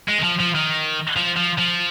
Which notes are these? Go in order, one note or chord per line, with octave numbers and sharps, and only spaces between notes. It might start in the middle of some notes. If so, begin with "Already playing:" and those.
G#3
D#3
F3
F3
D#3
F3
F3
F3